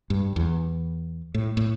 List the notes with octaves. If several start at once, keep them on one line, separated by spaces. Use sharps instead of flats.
G2
E2
A2
A2